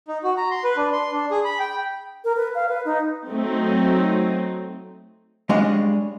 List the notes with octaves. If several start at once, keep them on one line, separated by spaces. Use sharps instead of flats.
D#4
F#4
A#5
C6
B4
D4
C6
D4
G#4
B5
G5
A#4
B4
F5
B4
D#4
F#3 A3 C4 D#4
G3 G#3 D4 C#5 D#5 F5